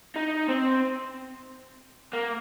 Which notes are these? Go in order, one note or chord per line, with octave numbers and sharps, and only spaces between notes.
D#4
C4
A#3